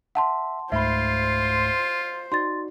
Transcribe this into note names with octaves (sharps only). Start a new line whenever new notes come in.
E5 F#5 A5 C6
C#2 G#2 A3 F4 C5 E5 B5
D#4 F#4 D5 C6 A6